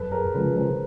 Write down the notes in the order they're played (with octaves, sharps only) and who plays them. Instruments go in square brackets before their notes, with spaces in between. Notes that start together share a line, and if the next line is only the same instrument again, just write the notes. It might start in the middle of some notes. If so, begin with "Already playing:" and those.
Already playing: [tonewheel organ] F#2 [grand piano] A4 B4
[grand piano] G#4 A#4
[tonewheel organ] C#3 F3 G#3 [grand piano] A4 B4
[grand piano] A#4 C5